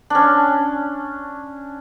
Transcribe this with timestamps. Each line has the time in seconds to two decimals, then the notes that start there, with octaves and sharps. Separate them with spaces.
0.10 C#4 D4